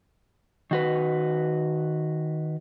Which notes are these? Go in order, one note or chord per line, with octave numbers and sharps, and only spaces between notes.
D#3 F#4 B4